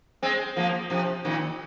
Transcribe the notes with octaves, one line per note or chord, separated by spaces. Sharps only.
G#3 C4
F3 A#3
C3 F3
A#2 D#3